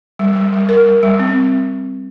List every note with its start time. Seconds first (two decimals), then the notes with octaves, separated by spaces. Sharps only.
0.19 G3
0.35 G3
0.52 G3
0.69 A#4
0.86 G3
1.03 G3
1.19 C4